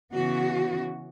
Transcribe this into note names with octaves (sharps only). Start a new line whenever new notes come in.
C#3 E3 B3 C#4 F#4